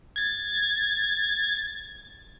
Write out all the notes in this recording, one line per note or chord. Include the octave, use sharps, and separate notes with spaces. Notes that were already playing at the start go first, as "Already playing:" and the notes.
G#6 A6